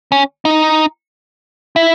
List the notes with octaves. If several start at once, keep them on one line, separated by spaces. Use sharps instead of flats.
C#4
D#4
E4